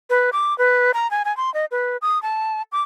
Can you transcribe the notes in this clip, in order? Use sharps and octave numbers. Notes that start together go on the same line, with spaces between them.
B4
D6
B4
A#5
G#5
G#5
C6
D#5
B4
D#6
A5
D6